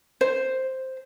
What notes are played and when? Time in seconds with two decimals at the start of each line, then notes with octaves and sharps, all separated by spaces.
0.21 C5